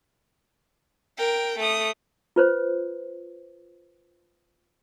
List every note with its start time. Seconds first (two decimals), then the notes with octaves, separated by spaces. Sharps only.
1.18 A#4 G5
1.59 A3 D#6
2.36 F4 B4 C5